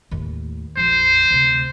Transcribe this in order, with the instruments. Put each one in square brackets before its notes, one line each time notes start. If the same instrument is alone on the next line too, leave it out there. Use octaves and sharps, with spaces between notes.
[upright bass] D#2 A2
[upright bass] A#1 F2 [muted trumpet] C5
[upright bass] D2 C3